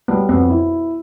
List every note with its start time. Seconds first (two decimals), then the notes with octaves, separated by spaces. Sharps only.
0.08 G3 B3
0.29 F2 B3
0.50 E4